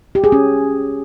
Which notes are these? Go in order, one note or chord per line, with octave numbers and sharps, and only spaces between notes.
G4
G#4
C#4